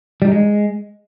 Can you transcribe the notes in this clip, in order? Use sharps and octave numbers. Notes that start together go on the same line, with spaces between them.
G3
D#4
G#3